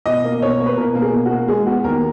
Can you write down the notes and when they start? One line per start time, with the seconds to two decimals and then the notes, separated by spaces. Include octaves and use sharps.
0.06 B2 D#5
0.24 A#3
0.42 B2 C#5
0.60 A#3
0.66 B4
0.77 B2 A#4
0.95 A#3
1.02 G#4
1.13 B2
1.26 F#4
1.31 A#3
1.48 G#3 G#4
1.67 B3 F#4
1.84 D#2 A#4